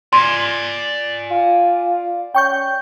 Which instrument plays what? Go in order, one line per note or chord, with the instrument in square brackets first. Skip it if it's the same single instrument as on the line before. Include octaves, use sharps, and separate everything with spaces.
[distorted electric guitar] D5 G#5 [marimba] C6
[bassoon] F4
[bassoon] C#4 [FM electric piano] G5 C#6 G6